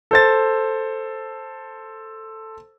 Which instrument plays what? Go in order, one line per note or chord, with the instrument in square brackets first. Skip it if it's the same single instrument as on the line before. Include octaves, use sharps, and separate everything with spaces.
[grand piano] A4 C5 A6